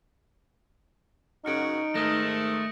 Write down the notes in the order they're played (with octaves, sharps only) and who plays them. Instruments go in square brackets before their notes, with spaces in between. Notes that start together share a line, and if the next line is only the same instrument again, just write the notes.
[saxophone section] F#2 C#3 F#4 [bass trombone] D#4 [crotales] F6 C#7 D7
[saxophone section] G#2 D#3 [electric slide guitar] A3 [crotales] D#6 F#6 A#6